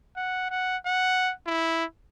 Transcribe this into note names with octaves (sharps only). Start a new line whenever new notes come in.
F#5
F#5
F#5
E4